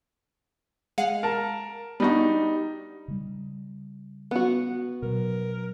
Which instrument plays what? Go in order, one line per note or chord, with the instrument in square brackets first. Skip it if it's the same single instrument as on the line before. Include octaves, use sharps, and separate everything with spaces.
[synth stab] G#3 F5 F#5
[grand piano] A#4 A5
[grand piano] G3 D#4 [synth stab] B3 D4 F#4
[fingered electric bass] C#3 G3
[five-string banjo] B3 F#4
[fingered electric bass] B2 F#3 [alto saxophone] A#4